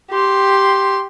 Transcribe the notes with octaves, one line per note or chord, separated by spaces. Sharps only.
G4 C6